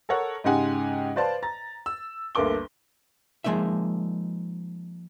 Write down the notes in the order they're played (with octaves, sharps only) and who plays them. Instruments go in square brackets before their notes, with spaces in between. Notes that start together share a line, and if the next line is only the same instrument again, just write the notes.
[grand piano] A4 A#4 C#5 F#5
G#2 C#3 G#3 G4 F#5 G#5
B4 C5 D5 F5 A5 C6
A#5 A6
E6
G1 D2 A#3 A4 D6 G7
[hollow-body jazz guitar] F3 G#3 A#3 D#4 E5